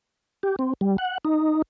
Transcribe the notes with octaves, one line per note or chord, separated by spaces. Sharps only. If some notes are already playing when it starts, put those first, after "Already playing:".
G4
C4
G3
F#5
D#4